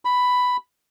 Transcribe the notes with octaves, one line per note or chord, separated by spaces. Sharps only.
B5